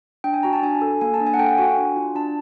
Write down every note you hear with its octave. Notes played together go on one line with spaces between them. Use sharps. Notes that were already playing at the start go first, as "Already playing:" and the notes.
D4 G5
G#5
F#4 A#5
A5
D4 G#5
A4
A#3 G#5
A5
D4
G#5
F#5
A4 G5
F#5
F#4 G#5
G#5
D4
F4
D4 A5